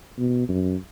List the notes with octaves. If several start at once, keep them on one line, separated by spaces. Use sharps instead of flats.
B2
F#2